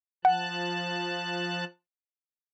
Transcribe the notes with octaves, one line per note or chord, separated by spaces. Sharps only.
F3 F#5 A5 F#6